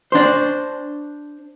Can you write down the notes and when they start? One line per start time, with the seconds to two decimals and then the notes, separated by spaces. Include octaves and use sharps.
0.12 D4 C5